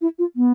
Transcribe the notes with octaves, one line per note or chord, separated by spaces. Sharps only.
E4
F4
B3